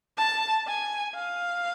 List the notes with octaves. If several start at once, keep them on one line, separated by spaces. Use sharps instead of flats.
A5
G#5
F5